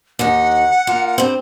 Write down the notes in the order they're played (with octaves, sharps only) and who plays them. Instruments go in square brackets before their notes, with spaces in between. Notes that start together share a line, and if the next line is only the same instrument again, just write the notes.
[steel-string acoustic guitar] D#2 D#4 [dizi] F#5
[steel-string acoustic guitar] A#3 F4
G2 C4